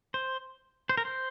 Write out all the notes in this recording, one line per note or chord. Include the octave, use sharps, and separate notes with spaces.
C5
C5
A#4
C5